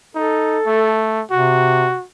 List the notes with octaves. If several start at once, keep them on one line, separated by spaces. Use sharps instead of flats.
D#4 A4
A3
C3 F#4